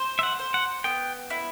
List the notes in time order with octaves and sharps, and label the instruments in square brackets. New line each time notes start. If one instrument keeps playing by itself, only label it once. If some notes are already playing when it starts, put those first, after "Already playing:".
Already playing: [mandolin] C5
[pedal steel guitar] E5
F#5
[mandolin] C5
[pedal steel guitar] F#5
[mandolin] B3 [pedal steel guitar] G5
[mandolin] E4